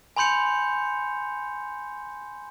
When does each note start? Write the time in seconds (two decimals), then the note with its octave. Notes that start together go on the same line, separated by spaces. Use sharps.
0.16 G#5 B5 C6 G6 C#7 F7